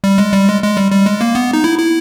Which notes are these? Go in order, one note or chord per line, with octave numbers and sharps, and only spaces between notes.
G3
G#3
G3
G#3
G#3
G3
G3
G#3
A#3
B3
D#4
E4
E4